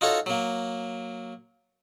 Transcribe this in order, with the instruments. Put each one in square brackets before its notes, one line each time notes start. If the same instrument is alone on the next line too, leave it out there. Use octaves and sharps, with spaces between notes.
[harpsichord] D#4 F4 F#4 A4 C#5
F#3 A#3